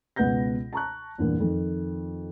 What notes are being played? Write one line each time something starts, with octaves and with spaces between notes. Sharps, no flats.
C#2 B2 B4 F#5 G6 A#6
A5 A#5 C#6 F#6
E2 G2 A#2
F2 D#3